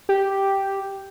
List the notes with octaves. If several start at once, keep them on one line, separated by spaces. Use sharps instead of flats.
G4